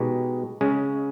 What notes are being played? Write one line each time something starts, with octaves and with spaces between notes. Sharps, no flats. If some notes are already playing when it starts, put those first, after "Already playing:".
Already playing: B2 G#3 D#4 G4
C#3 G#3 C#4